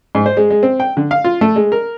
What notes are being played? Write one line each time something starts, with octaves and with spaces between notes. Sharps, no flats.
G#2
C5
G#3
G#3
C4
G5
D3
F5
F4
A3
G#3
A#4